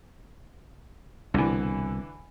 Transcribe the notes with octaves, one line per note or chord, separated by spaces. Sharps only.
C2 B2 D3 E3